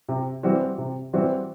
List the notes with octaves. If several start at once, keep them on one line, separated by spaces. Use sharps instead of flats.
C3
E3 G3 C4 F#4
C3
E3 G3 C4 F#4